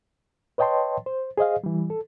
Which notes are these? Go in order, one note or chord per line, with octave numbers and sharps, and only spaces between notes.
B4 C#5 D#5 G5 A5 C6
C5
G#4 C5 D#5 F5
E3 G3
A4